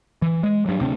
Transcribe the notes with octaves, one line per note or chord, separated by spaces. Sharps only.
E3
G#3
G2 F#3
D2 C3 C4 D4